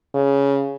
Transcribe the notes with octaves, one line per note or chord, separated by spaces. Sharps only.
C#3